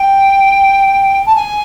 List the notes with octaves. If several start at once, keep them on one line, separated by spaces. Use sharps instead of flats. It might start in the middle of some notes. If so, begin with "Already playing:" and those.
Already playing: G5
A5
G#5